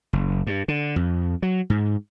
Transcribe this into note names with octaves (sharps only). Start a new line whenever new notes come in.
F#1
G2
D3
F2
F#3
G#2